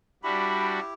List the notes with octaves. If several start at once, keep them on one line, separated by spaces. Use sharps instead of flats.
G3 D4 E4 F#4 G4 B5